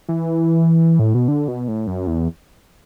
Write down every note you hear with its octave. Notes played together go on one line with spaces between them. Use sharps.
E3
A2
B2
D3
B2
A2
F#2
E2